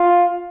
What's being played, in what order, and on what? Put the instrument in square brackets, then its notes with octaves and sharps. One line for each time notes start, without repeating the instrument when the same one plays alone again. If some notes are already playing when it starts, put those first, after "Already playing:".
Already playing: [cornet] F4